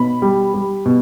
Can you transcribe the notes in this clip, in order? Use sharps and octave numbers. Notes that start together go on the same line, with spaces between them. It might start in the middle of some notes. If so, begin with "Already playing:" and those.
Already playing: B2 B5
G3
G3
B2